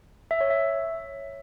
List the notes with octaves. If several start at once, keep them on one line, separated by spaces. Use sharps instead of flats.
E5
C#5
E5